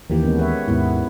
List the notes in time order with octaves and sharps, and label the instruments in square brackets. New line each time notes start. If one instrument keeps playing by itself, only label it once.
[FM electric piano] D#2 E3 A#3 [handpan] D#3 G4
[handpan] G#3 B3 C#4
B4 C#5 E5
[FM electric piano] D#2 G#2 [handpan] B3 E4